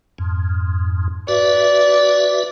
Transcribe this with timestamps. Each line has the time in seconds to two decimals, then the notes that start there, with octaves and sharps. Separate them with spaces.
0.18 F2 G#2
1.28 F#4 B4 D5 E5